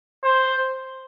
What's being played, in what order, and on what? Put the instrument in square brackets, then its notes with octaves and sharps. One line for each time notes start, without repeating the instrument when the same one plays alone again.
[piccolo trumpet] C5